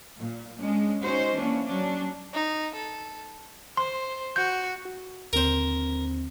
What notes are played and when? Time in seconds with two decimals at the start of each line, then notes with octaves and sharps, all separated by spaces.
0.15 A#2
0.57 G#3 C#4 D4
1.02 C#4 D#4 F#4 C5
1.35 E3 A#3 C#4 D4
1.66 F#3 C#4 D4
2.33 D#4
2.75 A4
3.77 C5 C6
4.36 F#4 G6
4.85 F#4
5.33 D#2 D3 C4 A#4 C5